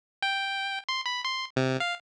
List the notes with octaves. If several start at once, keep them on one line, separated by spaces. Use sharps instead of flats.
G5
C6
B5
C6
C3
F5